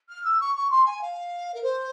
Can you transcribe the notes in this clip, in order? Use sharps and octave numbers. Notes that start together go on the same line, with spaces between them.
F6
E6
C#6
C#6
C6
G#5
F5
A#4
C5